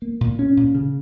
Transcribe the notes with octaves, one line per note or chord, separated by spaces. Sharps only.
A#3
A#2
C#4
A#2
C#3